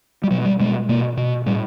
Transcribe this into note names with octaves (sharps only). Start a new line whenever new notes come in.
G3
B2 F#3
G3
B2 G#3
B2 A#3
B2
A2 G3